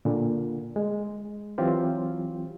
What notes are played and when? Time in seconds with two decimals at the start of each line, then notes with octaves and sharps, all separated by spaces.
0.05 A#2 D3
0.76 G#3
1.58 E3 F#3 C4 F4 G4